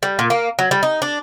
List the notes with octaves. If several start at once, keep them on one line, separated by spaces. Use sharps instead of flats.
G3
A#2
A#3
F#3
G3
D#4
D4